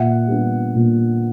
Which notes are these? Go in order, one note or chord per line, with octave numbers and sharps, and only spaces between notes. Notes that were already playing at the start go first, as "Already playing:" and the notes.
Already playing: A#2 E5 F#5
G3 B3 D4
A#2